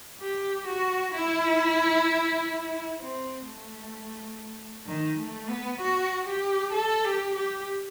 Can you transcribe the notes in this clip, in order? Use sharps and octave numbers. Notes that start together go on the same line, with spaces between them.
G4
F#4
E4
C4
A3
D#3
A3
B3
F#4
G4
A4
G4
G4